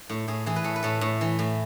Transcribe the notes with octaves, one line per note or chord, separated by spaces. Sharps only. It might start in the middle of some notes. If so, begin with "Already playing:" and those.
A2
A2 G#4
E3 G#4
B4
A2 A4
B4
A2 A4
A2
E3
A2